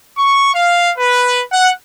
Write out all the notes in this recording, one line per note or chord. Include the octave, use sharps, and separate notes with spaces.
C#6
F5
B4
F#5